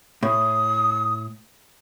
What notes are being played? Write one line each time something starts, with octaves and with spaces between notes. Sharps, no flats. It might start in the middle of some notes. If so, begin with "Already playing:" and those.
A2 D#6